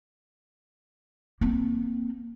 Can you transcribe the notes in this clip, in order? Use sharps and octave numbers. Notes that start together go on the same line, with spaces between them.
A#3 C4